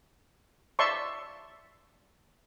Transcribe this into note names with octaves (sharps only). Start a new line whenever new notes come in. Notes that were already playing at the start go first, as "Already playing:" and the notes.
D5 E5 A5 C6 C#6